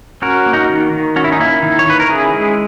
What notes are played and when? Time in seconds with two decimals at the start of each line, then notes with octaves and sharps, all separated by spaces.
0.22 C#4 F#4 A#4
0.46 A#3
0.53 D#4 F#4
0.70 D#3
0.93 D#3
1.16 C#4 F#4
1.24 E4
1.32 D#4
1.40 A#3 E4
1.63 D#3
1.79 C#5
1.87 D#3 B4
2.00 A#4
2.09 C#4 E4 G#4
2.33 G#3